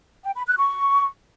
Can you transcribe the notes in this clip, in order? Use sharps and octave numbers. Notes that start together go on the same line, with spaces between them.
G5
B5
F#6
C#6